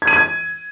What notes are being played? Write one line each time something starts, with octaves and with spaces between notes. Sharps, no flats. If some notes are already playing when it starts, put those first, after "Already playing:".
G#6
D#7
G#6